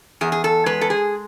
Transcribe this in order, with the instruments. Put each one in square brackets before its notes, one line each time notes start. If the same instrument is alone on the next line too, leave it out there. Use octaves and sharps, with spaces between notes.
[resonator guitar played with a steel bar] E2 G#4
G#4
A4
G#3 B4
A4
G#4